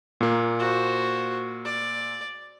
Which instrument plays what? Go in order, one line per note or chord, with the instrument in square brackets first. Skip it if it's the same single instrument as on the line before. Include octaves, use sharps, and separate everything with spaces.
[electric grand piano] A#2 A#3
[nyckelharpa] F#4 C5
D5